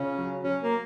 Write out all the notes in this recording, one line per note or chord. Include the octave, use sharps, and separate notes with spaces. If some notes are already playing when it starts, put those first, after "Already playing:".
Already playing: C#3 C#4 F4
F#3
F#3 C#4
A#3